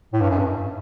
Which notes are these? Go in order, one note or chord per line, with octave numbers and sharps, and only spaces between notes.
A2
G2
F#2
G2